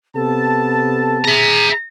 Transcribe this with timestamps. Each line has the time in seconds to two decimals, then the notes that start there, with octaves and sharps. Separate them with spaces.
0.15 C3 B3 A4 A5
1.24 G#4 E5 A#5